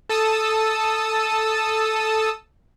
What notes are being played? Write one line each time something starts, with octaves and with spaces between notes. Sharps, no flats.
A4 A5 D#6 E6